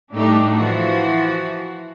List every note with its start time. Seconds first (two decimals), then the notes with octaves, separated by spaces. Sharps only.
0.14 A2 G3 A3 D4 D#4 G4
0.54 E3 F3 F#4